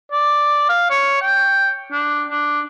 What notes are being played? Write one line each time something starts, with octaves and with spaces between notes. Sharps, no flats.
D5
F5
C#5
G5
D4
D4